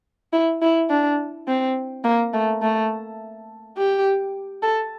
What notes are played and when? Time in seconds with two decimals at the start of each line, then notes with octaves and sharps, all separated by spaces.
0.33 E4
0.62 E4
0.90 D4
1.48 C4
2.05 A#3
2.33 A3
2.62 A3
3.77 G4
4.63 A4